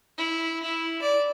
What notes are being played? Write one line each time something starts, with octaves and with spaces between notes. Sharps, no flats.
E4
E4
D5